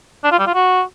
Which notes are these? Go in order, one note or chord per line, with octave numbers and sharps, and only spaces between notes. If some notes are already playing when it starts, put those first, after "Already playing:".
D4
F4
G3
F4
F#4